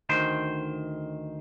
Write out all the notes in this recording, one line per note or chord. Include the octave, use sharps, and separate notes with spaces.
D2 D#3 C5